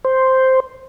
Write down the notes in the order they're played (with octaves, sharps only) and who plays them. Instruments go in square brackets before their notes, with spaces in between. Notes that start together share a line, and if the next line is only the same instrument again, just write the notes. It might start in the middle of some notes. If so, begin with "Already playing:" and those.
[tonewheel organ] C5